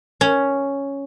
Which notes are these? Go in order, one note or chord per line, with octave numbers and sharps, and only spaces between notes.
C#4